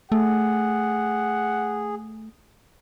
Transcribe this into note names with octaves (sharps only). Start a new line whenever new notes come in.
A3 G#4 F#5